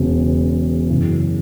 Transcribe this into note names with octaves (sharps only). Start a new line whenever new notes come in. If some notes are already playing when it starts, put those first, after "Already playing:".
Already playing: E1 E2 C#3
F#2 C#3 E3